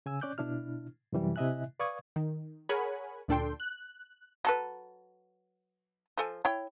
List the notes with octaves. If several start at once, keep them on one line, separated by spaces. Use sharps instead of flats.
C#3 G#5 E6
C#4 D5 D6 F#6 G6
B2 D4 E4 F6
F#2 C3 E3 G3
C3 E4 D#5 E5 G#5 F#6
B4 D5 F5 C#6 D#6 G#6
D#3
G#4 A#4 C#5 F#5 G#5 B5
D2 A#2 D4 A4 G5 C6
F#6
F#3 A4 B4
F3 A4 G#5
E4 C#5 G5